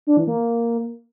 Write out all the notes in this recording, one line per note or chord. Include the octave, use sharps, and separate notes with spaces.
D4
E3
A#3